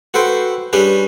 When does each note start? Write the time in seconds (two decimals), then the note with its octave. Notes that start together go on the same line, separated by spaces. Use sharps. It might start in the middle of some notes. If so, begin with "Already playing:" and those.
0.14 F#4 A4 B4 C5 G5
0.73 G3 C#4 D4 G4 G#4 B4